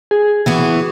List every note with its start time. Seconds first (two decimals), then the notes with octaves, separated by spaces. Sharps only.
0.11 G#4
0.46 E3 B3 F#4